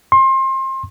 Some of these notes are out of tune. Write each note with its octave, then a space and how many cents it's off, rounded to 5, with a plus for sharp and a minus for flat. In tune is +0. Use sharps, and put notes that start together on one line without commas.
C6 +30